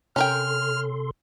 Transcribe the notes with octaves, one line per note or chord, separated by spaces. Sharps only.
C3 C#4 A4 A#4 G5 C6 F6